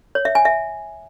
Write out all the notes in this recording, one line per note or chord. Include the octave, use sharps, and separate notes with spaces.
C#5
E5
G#5
E5